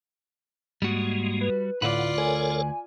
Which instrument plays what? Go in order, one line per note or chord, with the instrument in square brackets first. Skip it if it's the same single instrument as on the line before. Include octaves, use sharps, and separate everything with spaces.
[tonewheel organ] G#2 G#3 A#3 [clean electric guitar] G3 F#4
[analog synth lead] B4
[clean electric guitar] D2 B4 [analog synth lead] A2 [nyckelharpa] F4 D5 [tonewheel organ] F5 F#5
[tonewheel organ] A4 A#4 C#5 [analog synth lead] G#5